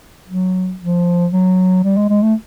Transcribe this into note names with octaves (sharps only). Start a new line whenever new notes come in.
F#3
F3
F#3
G3
G#3
G#3
A3